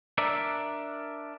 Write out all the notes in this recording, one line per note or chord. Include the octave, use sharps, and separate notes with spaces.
D4 A#4 D5 E5